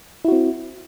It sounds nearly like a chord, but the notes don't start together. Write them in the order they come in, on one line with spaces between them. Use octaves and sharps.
E4 F#4 C4